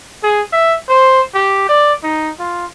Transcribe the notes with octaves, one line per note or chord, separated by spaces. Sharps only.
G#4
E5
C5
G4
D5
D#4
F4